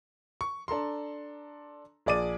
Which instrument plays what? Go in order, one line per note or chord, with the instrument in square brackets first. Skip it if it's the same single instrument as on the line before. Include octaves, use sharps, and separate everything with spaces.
[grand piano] C#6
D4 A4 A#5 C6
A#1 G#4 D5 D6 D#7